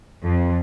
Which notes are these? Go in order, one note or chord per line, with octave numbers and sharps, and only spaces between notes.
F2